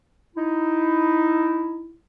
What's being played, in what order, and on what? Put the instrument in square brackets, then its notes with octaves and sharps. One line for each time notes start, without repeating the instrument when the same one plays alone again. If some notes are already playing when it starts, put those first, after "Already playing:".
[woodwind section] D#4 E4